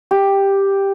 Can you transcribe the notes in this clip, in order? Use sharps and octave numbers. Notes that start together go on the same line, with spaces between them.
G4